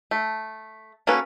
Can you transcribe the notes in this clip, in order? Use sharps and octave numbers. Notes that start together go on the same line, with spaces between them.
A3
A#3 C#4 F#4 A4 B4